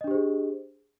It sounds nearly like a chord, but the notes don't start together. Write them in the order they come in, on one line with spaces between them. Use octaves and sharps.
D#5 D4 G4 C5 G#4